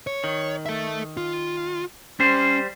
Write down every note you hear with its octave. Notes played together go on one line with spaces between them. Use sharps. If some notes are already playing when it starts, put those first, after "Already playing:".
C#5
D#3
A4 E5
F4
G3 C#4 C5